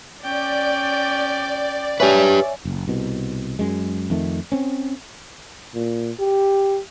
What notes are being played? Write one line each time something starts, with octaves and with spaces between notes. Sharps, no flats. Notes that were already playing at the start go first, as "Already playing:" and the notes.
C#4 D5 G5
G4 B4 C#5 E5 G#5
F#1
C2 B2
F#2 G#3
F2 D#3 A3
C4 C#4
A#2
G4